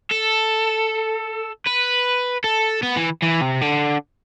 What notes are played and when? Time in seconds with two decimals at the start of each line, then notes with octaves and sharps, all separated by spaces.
0.11 A4
1.66 B4
2.44 A4
2.83 B3
2.97 E3
3.23 E3
3.42 C3
3.61 D3